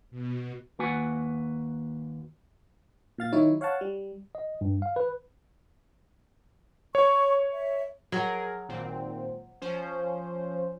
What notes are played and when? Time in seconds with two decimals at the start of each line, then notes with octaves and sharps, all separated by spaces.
0.10 B2
0.79 D#2 A#3 F#4 B4 F#5 G#5
3.18 A#2 F5 A6
3.32 D#3 F#3 D#4 E4 C#5
3.61 C#5 F5 F#5 A5
3.81 G3
4.35 D#5
4.61 G2
4.82 F5
4.96 B4
6.95 C#5 C#6
7.53 E5
8.12 F#3 G#4 A#4
8.69 G#1 A#2 C4
9.62 F3 C#4 C5